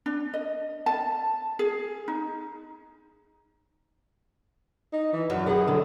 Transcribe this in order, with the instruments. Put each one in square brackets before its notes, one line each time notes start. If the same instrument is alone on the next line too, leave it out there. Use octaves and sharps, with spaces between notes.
[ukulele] D4
D#5
A5
G#4
D#4
[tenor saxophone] D#4
E3
[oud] F#2 [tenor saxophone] F#3
[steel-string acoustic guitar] G4 B4 F#5 [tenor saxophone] G#4
[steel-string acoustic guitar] D3 F#3